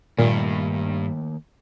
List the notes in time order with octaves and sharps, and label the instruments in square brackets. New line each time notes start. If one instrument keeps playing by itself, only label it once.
[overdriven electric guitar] G2 [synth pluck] A#2 [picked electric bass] D#3 A3 A#3